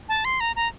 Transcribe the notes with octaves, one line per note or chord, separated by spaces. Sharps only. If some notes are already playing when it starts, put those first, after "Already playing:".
A5
C6
A#5
A#5